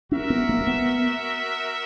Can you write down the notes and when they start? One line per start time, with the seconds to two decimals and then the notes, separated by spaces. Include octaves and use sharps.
0.11 C#4 F#4 A#4 E5
0.30 B3
0.49 A#3
0.61 A#3
0.67 B3